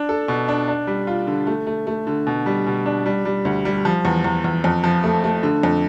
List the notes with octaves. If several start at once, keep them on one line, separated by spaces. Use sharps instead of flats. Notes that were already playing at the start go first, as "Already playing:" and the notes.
Already playing: D4
A4
B2
D4
D4
G3
F4
D3
A3
A3
A3
D3
B2
G3
B2
D4
G3
G3
D2
G3
F3
E2
E2
E2
F2
F3
A3
A3
D3
F2